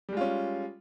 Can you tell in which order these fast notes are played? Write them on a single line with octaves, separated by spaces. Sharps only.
G3 G#3 F4 C#4